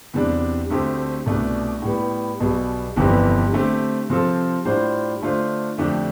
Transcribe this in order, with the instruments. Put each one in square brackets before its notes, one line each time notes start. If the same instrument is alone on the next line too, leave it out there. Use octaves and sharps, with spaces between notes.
[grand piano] E2 C3 G3 D4
D2 D3 A3 C4 G4
C2 B2 A3 D4
A2 G3 B3
B1 B2 G3
G1 F2 C3 E3 G3
D3 A3 C4 G4
C3 F3 C4 F4 A4
A2 G3 D4 F4 C5
D3 A3 D4 F4 C5
F2 D3 A3 D4 G4